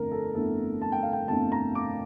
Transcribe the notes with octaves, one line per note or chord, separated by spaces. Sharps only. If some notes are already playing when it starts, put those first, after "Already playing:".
Already playing: G1 F2 D3 A3 A#4 A#5
A4
G1 F2 D3 A3 E4 A4
A5
G5
F5
G5
G1 F2 D3 A3 E4 A5
A#5
D6